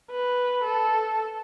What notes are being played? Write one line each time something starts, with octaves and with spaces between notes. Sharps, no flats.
B4
A4